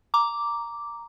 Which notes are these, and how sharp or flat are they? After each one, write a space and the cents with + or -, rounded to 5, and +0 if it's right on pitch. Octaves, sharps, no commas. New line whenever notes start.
A#5 +0 D6 -5